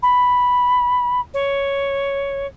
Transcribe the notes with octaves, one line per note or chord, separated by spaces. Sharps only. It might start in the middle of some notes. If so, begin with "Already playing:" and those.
B5
C#5